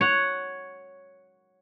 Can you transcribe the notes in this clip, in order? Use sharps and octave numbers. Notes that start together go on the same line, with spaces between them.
C#5 F#5